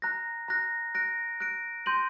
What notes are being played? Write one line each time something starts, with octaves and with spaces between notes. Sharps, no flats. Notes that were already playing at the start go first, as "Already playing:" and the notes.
A#5 F#6 A#6
A#5 F#6 A#6
F#6 A#6 D7
F#6 A#6 D7
C6 G6 A#6 D#7 F#7